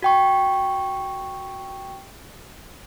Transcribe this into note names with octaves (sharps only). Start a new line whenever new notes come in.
F#4 G5 C#6